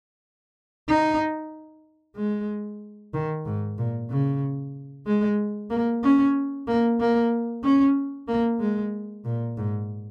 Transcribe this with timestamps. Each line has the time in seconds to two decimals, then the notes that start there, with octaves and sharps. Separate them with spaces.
0.88 D#4
2.16 G#3
3.14 D#3
3.45 G#2
3.78 A#2
4.10 C#3
5.06 G#3
5.70 A#3
6.03 C#4
6.67 A#3
7.00 A#3
7.64 C#4
8.28 A#3
8.60 G#3
9.25 A#2
9.57 G#2